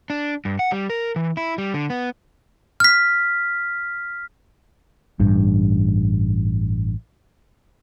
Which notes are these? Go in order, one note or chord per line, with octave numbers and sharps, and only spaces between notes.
D4
G2
F#5
G3
A#4
E3
E4
G3
D3
B3
F6 B6
A1 G2